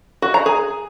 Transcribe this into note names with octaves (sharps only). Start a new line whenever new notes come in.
F#4
A#5
G#4